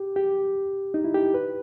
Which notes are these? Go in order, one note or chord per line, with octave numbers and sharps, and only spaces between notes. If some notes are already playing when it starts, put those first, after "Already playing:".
Already playing: G4
G4
D#4
E4
G4
B4